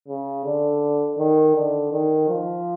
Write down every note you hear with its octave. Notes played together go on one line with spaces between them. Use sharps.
C#3
D3
D#3
D3
D#3
F3